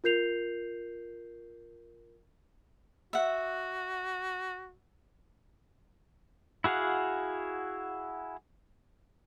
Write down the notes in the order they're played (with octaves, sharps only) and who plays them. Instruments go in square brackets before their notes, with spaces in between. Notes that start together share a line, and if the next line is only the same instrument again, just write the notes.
[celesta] F4 A#4 G6 C7 F7
[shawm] F#4 [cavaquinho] E5 F#5
[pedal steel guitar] E4 F#4 G#4 F5 F#5